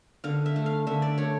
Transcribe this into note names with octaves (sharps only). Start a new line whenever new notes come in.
D3 F5
E5
A3
F5
D3 E5
D5
A3 C#5